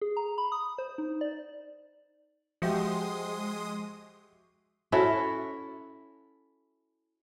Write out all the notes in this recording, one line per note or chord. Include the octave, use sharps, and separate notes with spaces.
G#4
A#5
B5
D#6
C5
D#4
D5
F3 G#3 F#4 G4 E5 C6 D#6
C#4 E4 F#4 A4